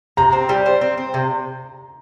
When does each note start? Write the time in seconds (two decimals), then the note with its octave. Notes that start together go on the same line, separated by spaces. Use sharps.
0.17 C3 A#5
0.33 C4
0.49 G3
0.66 C4
0.81 C4
0.98 C4
1.14 C3